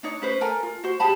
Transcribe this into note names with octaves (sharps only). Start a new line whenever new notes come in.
D4 D#4 C#5
C#4 B4 C5
A4 A#4 G#5 A#5
F4
F#4 C5
G4 G#4 A5 B5